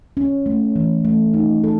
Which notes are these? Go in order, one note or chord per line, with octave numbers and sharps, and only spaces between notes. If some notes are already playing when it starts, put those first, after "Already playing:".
C#4
A3
E3
A3
D#4
A4